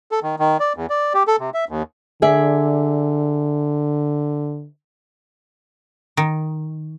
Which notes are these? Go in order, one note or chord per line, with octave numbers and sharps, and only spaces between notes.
A4
D#3
D#3
D5
E2
D5
G4
A4
C3
E5
D#2
D3 G#4 D5 E5
D#3